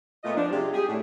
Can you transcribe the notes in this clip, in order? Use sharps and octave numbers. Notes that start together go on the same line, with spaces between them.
A#2 A3 B3 F4 D#5
F3 D4
C3 G3 G#3 D4 F4
G4 G#4
A2 D4